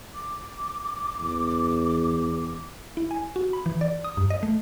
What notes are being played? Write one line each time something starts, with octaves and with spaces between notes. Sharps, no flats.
D6
E2
E4
G#5
F#4
B5
E3
D5
D#6
G2
D#5
A3